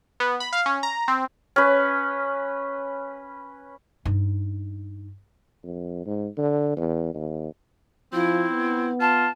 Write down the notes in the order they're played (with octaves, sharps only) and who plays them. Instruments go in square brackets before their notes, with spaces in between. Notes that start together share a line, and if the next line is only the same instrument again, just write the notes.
[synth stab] B3
B5
F5
C#4
A#5
C4
[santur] C#4 B4
[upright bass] G2 D#4
[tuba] F2
G#2
D3
E2
D#2
[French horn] F3 [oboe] C4 [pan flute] E4
[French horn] B3
[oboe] F4 [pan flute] A5